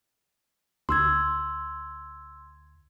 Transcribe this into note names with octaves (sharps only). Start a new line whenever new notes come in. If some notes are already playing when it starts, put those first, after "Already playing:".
D2 C6 E6 G#6